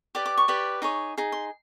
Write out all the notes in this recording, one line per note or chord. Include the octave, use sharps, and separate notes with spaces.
G4 B4 D5 D6
D6
C#6
G4 B4 D5
D#4 G#4 C#5
D#4 G#4
C6